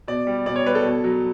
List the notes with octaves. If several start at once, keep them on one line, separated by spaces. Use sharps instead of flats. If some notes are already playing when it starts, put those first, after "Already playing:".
B2 D5
G3
B2 D5
C#5
G3 B4
A4
B2
F#3